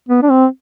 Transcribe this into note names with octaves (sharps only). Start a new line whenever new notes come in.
B3
D4
C4